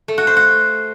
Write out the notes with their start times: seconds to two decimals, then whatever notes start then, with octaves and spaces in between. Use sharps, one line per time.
0.08 A3
0.18 F#4
0.27 C5
0.36 F#4